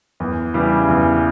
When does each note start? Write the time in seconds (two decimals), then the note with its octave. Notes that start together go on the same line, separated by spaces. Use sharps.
0.20 E2
0.54 C#3 E3 G3
0.88 E2